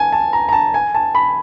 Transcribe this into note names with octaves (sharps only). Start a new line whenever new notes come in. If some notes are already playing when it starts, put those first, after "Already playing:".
Already playing: G#5 A5
A5
A#5
A#5
A5
G#5
A5
B5